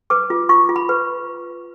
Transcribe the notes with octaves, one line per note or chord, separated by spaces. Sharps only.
B4 D6
F4
F4 C#6
F4
B5
B4